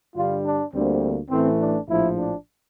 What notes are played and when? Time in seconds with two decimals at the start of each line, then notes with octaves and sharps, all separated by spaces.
0.15 G2 D3 G3 F4
0.44 D4
0.72 D2 D3 G3 A#3 C4
1.29 A1 A2 E3 A3 C4
1.58 D4
1.87 A#1 A2 F3 E4
2.16 D4